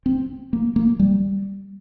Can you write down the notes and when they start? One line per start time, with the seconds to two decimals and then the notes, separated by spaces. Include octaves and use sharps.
0.06 C4
0.53 A#3
0.76 A#3
0.99 G3